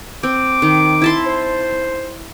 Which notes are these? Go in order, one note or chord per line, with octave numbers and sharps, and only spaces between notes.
C4 D6
D#3
E4 A5 C6
C5